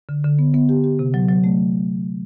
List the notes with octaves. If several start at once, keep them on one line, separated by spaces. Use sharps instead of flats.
D3
D3
B3
B3
G4
G4
C3
F#3
F#3
A3